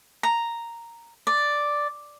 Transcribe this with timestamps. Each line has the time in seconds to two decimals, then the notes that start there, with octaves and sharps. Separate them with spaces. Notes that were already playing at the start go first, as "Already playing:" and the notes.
0.23 A#5
1.27 D5